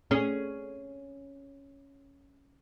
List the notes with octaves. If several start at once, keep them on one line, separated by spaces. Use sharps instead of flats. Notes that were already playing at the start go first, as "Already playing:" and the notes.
C#4 G#4